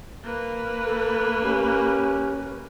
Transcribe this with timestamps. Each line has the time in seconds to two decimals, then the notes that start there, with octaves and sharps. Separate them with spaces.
0.24 A#3 B4
0.86 A4
1.43 C#4 G4